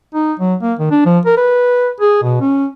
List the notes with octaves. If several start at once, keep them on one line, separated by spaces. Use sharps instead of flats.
D#4
F#3
A#3
D#3
D4
F3
A#4
B4
G#4
B2
C#4